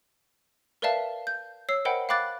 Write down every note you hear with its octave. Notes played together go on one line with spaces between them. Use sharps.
A#4 B4 D5 E5 F5 A5
G6
C#5 E6 C7
A#4 C5 D#5 F#5 G5 B5
F5 G5 B5 D6 F#6 A6